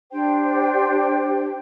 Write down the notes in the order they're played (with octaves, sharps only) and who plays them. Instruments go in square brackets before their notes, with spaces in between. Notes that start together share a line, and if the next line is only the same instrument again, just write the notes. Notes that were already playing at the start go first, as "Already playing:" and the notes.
[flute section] D4 G4 C5 G5